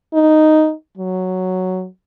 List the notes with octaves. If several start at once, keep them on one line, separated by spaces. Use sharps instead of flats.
D#4
F#3